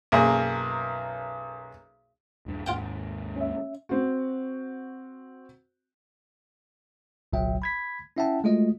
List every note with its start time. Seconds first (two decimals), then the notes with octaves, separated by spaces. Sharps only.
0.12 B1 F#2 A#3 G#4
2.46 D#1 G2
2.66 G#1 D#2 G#2 F4 F#5 G5
3.36 C#4 E5
3.89 C4 F#4
7.33 G1 C2 A#2 F#3 E5 G5
7.62 B5 G#6 B6
8.17 C#4 E4 E5 F#5 G5 A5
8.44 G#3 A3 F4 F#4 D#5